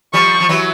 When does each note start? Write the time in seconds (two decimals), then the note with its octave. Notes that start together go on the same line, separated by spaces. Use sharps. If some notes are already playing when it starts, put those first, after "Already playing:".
0.13 F3 G3 C#6
0.40 F3
0.49 E3 F#3